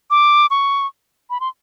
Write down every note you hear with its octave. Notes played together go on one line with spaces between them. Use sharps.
D6
C#6
B5
C6